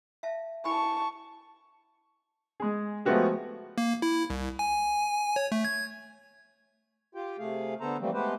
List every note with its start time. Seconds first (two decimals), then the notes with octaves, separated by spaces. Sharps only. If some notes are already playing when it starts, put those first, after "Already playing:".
0.23 E5 F5 A5
0.65 E4 G#5 A5 B5 C#6
2.60 G#3 G#4
3.05 F3 G#3 A3 B3 F#4 G4
3.78 A#3
4.02 E4
4.30 C2
4.59 G#5
5.36 C#5
5.52 A3
5.65 G#6
7.15 F4 G4 G5
7.39 C3 A3 G#4 F5
7.80 D3 B3 A4 C5 A#5
8.00 E3 F3 G3 A3 A#3 C4
8.14 G#3 A3 B3 G4 B4 C5